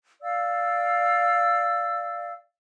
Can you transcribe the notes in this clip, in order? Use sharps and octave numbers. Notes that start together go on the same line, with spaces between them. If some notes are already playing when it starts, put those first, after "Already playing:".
D5 F5 E6